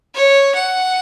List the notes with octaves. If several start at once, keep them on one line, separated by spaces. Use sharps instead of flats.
C#5
F#5